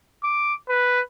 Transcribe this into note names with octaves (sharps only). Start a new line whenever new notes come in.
D6
B4